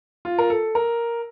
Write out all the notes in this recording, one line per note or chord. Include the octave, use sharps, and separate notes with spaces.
F4
A#4
A4
A#4